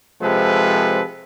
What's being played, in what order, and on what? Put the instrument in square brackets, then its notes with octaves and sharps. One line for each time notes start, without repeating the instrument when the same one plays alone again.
[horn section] C3 F3 G#3 A4 B4